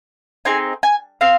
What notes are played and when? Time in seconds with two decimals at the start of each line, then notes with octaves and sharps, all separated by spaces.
0.45 C4 D#4 G#4 G#5
0.83 G#5
1.21 C4 F5